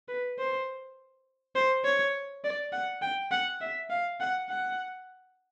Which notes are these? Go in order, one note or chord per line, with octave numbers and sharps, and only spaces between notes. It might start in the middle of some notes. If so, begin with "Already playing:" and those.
B4
C5
C5
C#5
D5
F#5
G5
F#5
E5
F5
F#5
F#5